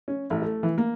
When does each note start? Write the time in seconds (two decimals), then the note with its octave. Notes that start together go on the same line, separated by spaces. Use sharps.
0.08 C#4
0.30 A1
0.42 A3
0.63 E3
0.78 A#3